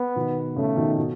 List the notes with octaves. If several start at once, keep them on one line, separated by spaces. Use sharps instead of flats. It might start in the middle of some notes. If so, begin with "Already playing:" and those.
Already playing: B3
B2 D#3
C#3 A3
B2 D#3
B2